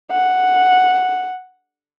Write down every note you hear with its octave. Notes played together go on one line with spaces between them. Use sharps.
F#5